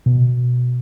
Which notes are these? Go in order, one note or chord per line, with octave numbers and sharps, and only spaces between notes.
B2